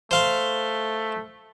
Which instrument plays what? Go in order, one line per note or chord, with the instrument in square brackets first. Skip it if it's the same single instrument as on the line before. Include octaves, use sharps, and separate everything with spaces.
[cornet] A3 [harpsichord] C5 F5 C6